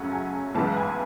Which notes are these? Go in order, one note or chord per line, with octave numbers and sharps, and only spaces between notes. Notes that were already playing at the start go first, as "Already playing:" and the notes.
Already playing: F#2 C#3 F#3 A3 C#4 F#5
G#5
B1 A2 E3 G#3 B3 A5
G#5